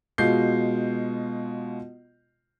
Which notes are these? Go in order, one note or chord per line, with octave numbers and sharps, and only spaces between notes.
B2 G#3 F4 G6 C7